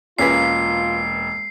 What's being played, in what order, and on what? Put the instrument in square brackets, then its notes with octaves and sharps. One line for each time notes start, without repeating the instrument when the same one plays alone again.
[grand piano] E1 A#3 B6 [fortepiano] C#4 G#4 B4 [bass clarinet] F4 [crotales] C7